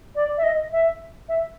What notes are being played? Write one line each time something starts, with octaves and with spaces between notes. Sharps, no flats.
D5
E5
D#5
E5
E5